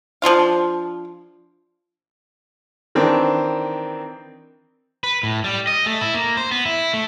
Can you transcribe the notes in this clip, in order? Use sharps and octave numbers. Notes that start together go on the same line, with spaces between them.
F3 D4 F4 F5
D#3 E3 C4 D4
B4
A2
G3
D#5
A3
E4
A#3
C5
B3
E4
A3